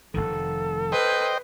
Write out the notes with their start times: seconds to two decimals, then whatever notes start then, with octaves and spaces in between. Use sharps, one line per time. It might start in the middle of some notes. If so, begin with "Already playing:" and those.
0.14 F1 C2 D#3 A4
0.92 B4 C5 D#5 G5